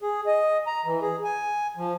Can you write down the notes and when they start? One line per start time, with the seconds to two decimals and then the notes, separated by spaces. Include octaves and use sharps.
0.02 G#4
0.27 D#5
0.67 A#5
0.85 E3
1.02 G#4
1.24 G#5
1.77 F3